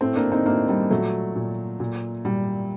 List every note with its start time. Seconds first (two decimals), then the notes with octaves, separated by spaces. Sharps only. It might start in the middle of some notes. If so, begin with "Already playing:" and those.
0.01 A2 A3 C4
0.16 A#3 D4
0.32 C4 D#4
0.46 A2 A#3 D4
0.68 G3 A#3
0.90 A#2 F#3 A3
1.36 A#2
1.80 A#2
2.25 A#2 G3